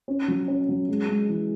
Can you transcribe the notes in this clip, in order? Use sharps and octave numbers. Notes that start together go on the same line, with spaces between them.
C#4
F#3
C#4
F#3
G#3
G#3
E3